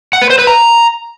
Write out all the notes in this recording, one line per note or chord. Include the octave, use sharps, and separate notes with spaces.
F#5
B4
C5
B4
A#5